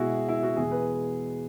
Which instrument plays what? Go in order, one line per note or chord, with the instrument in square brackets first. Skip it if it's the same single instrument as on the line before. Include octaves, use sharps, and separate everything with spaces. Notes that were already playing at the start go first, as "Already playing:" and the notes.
Already playing: [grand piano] B2 G#3 E4 F#4 G#4
E4
F#4
E2 B2 G#3 G#4
B4